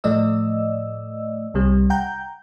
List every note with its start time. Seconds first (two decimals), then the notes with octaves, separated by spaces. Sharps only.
0.04 A2 F3 A3 D5 D#5 E6
1.54 C2 C3 G3
1.90 F#5 G5 A#5 G6